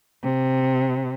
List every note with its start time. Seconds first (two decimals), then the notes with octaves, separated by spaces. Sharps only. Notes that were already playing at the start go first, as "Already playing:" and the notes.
0.23 C3